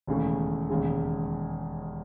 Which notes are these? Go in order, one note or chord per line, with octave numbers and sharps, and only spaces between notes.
E1 D#2 C#3 E3 A3
E1 D#2 C#3 G#3